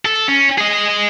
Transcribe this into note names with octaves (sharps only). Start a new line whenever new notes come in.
A4
C#4
G#4 D#5